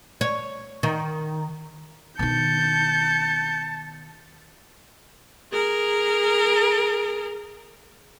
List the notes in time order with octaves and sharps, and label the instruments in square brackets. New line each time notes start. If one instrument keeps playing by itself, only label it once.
[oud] C#5
D#3
[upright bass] B2 D#3 [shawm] A5 [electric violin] G6 C#7
[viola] G#4 A#4